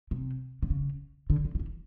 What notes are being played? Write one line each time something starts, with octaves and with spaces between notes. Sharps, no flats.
C3
D3
C#3
D3
D3
D#3
E3